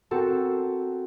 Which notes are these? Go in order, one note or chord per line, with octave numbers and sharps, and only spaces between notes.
C4 F#4 A4 A#4